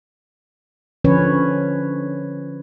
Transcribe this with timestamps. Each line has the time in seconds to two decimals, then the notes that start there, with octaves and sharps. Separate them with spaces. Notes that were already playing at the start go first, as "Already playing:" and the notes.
1.04 D3 F3 C#4 B4 C#5